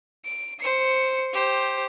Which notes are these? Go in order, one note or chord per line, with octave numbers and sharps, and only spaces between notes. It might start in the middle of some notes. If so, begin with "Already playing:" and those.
D7
C5 C#7
G4 C5